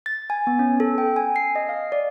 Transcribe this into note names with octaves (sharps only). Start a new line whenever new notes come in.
A6
G#5
B3
C#4
A4
G5
G#5
C7
D#5
F5
D5